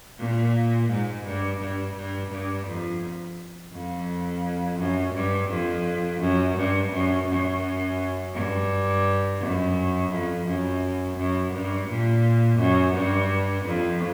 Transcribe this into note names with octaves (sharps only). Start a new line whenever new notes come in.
A#2
G#2
G2
G2
G2
G2
F2
F2
F#2
G2
F2
F#2
G2
F#2
F#2
G2
F#2
F2
F#2
F#2
G2
A#2
F#2
G2
F2